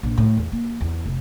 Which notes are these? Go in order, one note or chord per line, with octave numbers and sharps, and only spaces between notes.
A#1
A2
E2
A#3
E2
F1